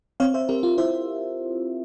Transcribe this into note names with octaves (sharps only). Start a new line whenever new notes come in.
C4 C#5 F5
C5 E5
C4 G4 A#4
F4
E4 C5 E5